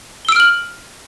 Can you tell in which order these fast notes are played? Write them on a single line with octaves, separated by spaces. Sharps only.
G7 E6 D7 F6 F#7